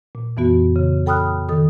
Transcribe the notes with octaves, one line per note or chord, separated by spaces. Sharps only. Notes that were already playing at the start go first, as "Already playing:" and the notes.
A#2
F2 E3 B3 F#4
C#3
A4 G5 B5 D#6 F6 F#6
D#3 A4 D#6